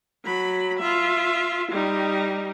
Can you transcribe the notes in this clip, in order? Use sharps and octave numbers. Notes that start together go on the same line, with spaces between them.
F#3 B5
F4 E5
G3 D#4